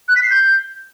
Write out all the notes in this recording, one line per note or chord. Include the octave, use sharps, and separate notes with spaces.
F#6
B6
C7
G6